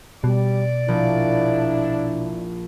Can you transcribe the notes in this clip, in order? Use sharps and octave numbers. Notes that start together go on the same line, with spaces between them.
B2 G3 D5
A#1 D4 E4